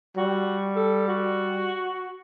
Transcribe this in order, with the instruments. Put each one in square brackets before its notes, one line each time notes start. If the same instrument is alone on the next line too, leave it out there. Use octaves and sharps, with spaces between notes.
[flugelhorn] G3 [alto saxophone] F#4
[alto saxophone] A4
F#4